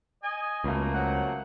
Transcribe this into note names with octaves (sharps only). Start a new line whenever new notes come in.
D#5 G#5
C#2 B2 A3 A#3
F#3 C4 F#5